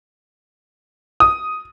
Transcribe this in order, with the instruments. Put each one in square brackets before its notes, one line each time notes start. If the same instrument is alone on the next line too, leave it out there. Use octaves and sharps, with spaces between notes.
[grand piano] D#6